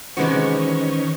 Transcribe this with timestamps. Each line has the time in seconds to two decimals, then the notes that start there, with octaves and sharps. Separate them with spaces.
0.17 C3 D#3 E3 G#3 C#4 F#4 B4 C5